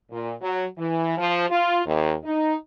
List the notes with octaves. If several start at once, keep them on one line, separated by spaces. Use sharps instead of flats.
A#2
F#3
E3
F3
F4
D#2
D#4